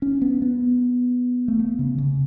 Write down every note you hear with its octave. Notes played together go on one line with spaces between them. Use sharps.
C#4
B3
B3
A3
B3
C#3
C#3